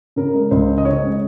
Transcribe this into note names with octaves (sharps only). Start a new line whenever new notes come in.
C#3 A#4
G#3
C#2 C5
C#4
D#5
C#3 C#5
G#3